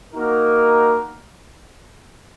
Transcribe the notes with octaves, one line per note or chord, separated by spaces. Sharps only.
A#3 D#4 F#4 A#4